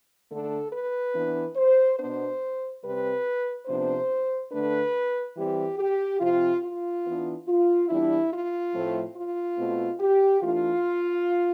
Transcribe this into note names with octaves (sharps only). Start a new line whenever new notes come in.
D3 A3 D4 A4
B4
E3 B3 D4
C5
B2 B3 D4 C5
C3 G3 C4 B4
C3 F3 B3 D4 C5
D3 A3 D4 B4
E3 G3 C4 G4
G4
C3 F3 C4 F4
F4
E3 B3 D4
F4
E3 G3 B3 D4 E4
F4
A2 F3 A3 C4
F4
B2 A3 C4
G4
E3 A3 D4 F4